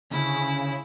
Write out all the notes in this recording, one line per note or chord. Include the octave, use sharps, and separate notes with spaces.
D2 C#3 C#4 E4 F4 G#4